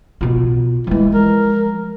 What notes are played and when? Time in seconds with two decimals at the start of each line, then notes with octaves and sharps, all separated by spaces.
0.21 B2 F4
0.87 E3 F3 G#3
1.14 A#4